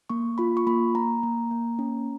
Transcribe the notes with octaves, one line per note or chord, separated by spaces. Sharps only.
A#3 C#6
F4 B5
C#6
A#3 B5
A#3 A#5
A#3
A#3
C#4